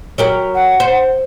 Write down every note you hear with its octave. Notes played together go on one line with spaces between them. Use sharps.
F#3 G4 A#4
F#5
C5